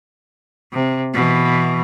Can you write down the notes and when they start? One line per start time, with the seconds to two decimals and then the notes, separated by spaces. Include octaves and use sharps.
0.73 C3
1.14 B2 E3